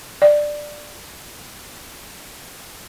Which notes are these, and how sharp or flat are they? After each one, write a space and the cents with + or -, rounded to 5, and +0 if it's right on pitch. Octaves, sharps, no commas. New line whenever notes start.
D5 +10